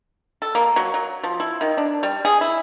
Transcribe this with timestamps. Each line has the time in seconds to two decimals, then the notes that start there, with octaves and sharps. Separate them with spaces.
0.42 A4
0.55 A#3
0.76 F#3
0.94 F#3
1.23 F3
1.40 E4
1.61 D#3
1.77 D4
2.03 G3
2.25 G#4
2.41 E4